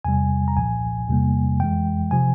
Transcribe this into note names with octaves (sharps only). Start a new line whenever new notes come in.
E2 C3 G3 G#5
A#5
C2 A#2 F3 G#5
E2 C3 G3 A#3
F2 E3 G#3 G5
C3 F3 G#5